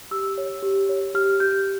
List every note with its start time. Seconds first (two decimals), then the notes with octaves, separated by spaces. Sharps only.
0.11 G4 E6
0.38 C#5
0.63 G4
0.89 C#5
1.14 G4 F6
1.40 G4 G6